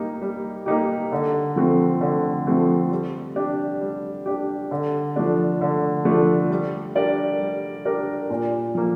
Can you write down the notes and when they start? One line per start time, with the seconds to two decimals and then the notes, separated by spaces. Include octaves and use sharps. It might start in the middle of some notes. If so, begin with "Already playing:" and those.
Already playing: G3 A#3 D#4 G4
0.22 G3
0.66 A#3 D#4 G4
1.12 D3
1.56 F3 A3 C4
2.01 D3
2.47 F3 A3 C4
2.91 G3
3.36 D4 G4
3.81 G3
4.26 D4 G4
4.71 D3
5.16 F3 A3 D4
5.61 D3
6.05 F3 A3 D4
6.50 G3
6.95 D4 G4 A#4 D5
7.40 G3
7.85 D4 G4 A#4 D5
8.30 A#2
8.75 F3 A#3